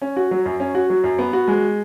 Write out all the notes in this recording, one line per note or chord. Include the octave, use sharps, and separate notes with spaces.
C#4
F#4
F#3
F#2
C#4
F#4
F#3
F#2
B3
F#4
G#3